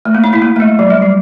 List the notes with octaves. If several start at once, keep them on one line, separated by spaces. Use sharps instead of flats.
A3
A#3
D#4
E4
A#3
A3
G#3
F#3
G3
F#3